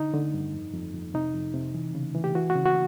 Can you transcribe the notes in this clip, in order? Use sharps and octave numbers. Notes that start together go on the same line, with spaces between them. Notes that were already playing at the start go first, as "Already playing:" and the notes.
Already playing: D3 D#4
D3
G2
F2
F2
F2
C3 D#4
F2
C3
E3
C#3
E3
G4
E3 F#4
F#4
C#3
F#4